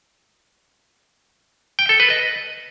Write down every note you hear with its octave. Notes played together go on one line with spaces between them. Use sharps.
G5
A4
B4
D#5